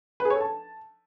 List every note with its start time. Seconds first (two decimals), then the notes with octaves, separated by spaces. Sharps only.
0.20 B4
0.25 G#4
0.30 C#5
0.35 A4
0.41 A5